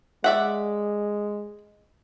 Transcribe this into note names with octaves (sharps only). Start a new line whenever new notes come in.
G#3 D5 E5 F#5